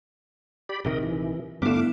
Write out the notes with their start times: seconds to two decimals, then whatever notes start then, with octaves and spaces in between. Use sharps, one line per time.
0.69 G4 D5 B5
0.85 A#1 C3 D#3 A#4 D#5
1.03 E3
1.62 G2 D3 A3 B3 E4 F5 D6